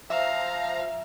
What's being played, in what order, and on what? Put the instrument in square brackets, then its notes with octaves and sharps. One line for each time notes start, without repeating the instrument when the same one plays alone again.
[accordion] F3 A#5 [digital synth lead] E5 [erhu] F5